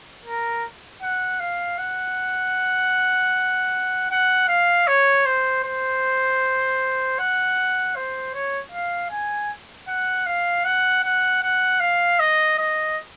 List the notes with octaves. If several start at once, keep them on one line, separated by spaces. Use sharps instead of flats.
A#4
F#5
F5
F#5
F#5
F5
C#5
C5
C5
F#5
C5
C#5
F5
G#5
F#5
F5
F#5
F#5
F#5
F5
D#5
D#5